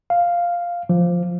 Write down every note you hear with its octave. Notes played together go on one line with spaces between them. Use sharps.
F5
F3